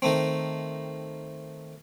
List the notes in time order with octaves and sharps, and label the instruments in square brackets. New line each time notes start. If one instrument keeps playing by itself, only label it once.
[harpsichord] D#3 A3 C4